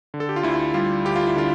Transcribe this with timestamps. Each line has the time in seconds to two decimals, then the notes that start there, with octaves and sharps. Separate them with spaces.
0.14 D3
0.20 A4
0.29 G4
0.36 F4
0.43 D2 E4
0.74 G3 F4
1.05 D2 G4
1.16 F4
1.27 E4
1.36 D3 F4